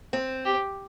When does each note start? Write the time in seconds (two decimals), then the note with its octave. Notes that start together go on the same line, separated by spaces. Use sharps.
0.13 C4
0.45 G4